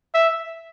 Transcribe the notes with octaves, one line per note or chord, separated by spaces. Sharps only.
E5